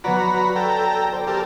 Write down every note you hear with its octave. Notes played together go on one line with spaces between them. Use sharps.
F#3 B3 F#4 D5 A#5 B5
A4 G5 A#5
C5 D5
G4 A4 A#4